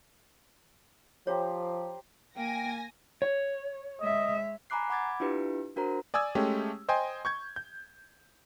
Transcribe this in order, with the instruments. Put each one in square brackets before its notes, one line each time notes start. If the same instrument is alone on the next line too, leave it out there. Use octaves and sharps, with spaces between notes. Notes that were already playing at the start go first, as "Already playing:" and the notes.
[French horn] F3 [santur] G4 C5 A#5 [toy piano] C#5
[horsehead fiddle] A#3 [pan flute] G5 [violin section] G#5 A#6
[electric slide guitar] C#5
[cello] G#3 E5 [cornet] D#5
[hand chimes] G#5 A#5 B5 D6 F#6 C7
F#5 B5 D6 G#6 A6
D4 E4 F4 G4 B4
D4 F#4 A#4 C5 A#5
[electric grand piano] D5 G#5 D#6 E6 G#6
G#3 A3 C#4 G4
C5 D#5 G5 G#5 C6
C#6 G6 G#6
G6